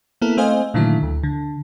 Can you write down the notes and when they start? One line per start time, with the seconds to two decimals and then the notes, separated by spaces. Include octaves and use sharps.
0.22 A#3 B3 E4 A4 A#4
0.37 A3 C4 C5 D#5 F5 G#5
0.74 A#2 D3 D#3 F#3 A3 E4
1.03 D2
1.23 D3